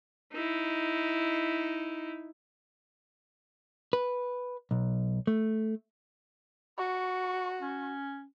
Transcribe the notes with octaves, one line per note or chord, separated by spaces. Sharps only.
D#4 E4
B4
B1
A3
F#4 C#6
C#4